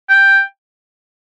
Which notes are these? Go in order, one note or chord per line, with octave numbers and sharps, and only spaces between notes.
G5